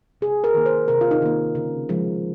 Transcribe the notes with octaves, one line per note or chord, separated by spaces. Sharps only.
C3 G#4
A#4
D#3 A#3
C5
C3 A#4
F4
D#4
D#3 A#3
C#3
F3 G#3